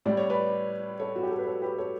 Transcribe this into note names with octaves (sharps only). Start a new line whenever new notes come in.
A2 G3 D5
C#5
B4 D5
A4 C#5
F#4
G4
A4
B4
A4 C#5
G4 B4
A4 C#5